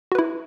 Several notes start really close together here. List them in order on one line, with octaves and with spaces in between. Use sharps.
F#4 B4 E4